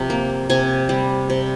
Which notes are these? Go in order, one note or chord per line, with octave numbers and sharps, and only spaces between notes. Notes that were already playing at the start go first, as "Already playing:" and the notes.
Already playing: C3 F3
A#3
C3 G#5
G3
C3